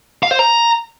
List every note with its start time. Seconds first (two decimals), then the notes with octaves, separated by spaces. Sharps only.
0.23 F5
0.31 C5
0.39 A#5